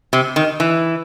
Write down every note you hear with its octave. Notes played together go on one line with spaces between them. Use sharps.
C3
D#3
E3